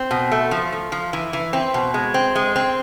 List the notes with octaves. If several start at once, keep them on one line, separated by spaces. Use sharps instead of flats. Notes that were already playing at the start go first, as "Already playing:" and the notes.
Already playing: C4
B2
A3
F3
F3
F3
E3
E3
C4
B2
G#3
C4
G#3
C4